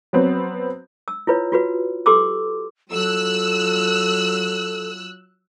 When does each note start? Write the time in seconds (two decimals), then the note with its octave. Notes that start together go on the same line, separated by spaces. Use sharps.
0.13 F#3 B3 C4
1.08 E6
1.27 E4 F4 B4 C#5
1.52 F4 F#4 B4
2.06 G4 A4 C6 D6 E6
2.92 F#3 F4 A4 E6 F#6